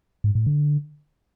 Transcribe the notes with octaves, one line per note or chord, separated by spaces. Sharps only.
G#2
A2
D3